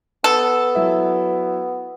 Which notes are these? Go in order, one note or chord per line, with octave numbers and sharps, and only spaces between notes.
B3 A4
F#3 E4 E5